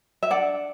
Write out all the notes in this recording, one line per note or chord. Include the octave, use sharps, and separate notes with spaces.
E5
D4 D5 F#5